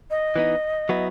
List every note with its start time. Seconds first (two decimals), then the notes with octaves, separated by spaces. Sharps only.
0.10 D#5
0.36 E3 B3 D#4
0.89 F#3 B3 E4